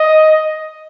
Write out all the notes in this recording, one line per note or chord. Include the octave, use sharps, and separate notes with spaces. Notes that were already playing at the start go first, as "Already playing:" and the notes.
Already playing: D#5